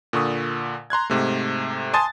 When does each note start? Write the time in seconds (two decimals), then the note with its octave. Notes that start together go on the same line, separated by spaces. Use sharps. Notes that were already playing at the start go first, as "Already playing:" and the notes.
0.13 A#2 D3 C#6 D#6
0.90 A#5 C6 F#6 G#6
1.10 G#2 C3 A3
1.94 G#5 A5 C6 D#6 A6